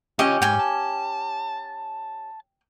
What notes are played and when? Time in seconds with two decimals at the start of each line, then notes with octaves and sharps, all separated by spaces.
0.19 C#4 F4 G4 C#5 D#5
0.42 G#2 G5 G#5
0.59 A5